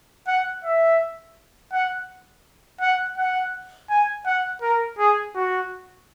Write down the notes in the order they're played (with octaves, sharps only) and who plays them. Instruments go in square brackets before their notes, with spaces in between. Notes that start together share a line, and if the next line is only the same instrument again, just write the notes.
[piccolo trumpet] F#5
E5
F#5
F#5
F#5
G#5
F#5
A#4
G#4
F#4